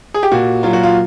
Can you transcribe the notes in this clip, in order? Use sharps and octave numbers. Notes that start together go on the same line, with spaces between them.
G#4
G4
A#2 F#4
F#3 F4
F#4
F4